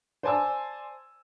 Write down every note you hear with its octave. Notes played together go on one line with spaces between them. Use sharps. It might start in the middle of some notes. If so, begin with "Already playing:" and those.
C5 D5 G#5 A5 E6